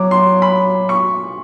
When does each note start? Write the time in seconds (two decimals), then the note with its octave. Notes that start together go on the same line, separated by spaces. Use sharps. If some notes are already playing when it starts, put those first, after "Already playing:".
Already playing: F#3 D6
0.11 C6
0.42 B5
0.89 C#6